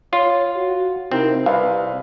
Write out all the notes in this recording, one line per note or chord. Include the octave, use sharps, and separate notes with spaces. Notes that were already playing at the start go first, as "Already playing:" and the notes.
F4 C#5
F#4
C3 C4 D#4 E4 A#4
C2 B4 F5